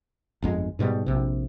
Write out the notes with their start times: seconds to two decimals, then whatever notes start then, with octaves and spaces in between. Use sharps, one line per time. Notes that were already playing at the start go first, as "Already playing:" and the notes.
0.42 G1 F2 G#3
0.79 G#2 B2 D#3 G3
1.06 A#1 C3